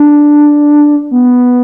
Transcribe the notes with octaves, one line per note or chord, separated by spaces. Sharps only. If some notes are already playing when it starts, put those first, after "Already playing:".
Already playing: D4
B3